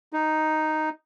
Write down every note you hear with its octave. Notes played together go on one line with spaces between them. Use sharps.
D#4